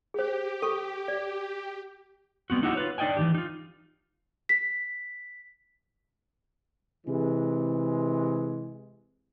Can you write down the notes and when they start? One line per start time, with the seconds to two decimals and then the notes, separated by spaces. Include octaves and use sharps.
0.14 G4 G#4 C5
0.62 A4 C#6
1.08 D5
2.50 G3 B3 C4 F#4
2.62 A#3 D#4 E4 F#4 G4 F#5
2.75 F4 B4 C#5
2.98 D4 D#4 D5 D#5 G5 G#5
3.17 E3 F3 G4
3.35 D#4 F4
4.49 B6
7.07 C3 E3 G#3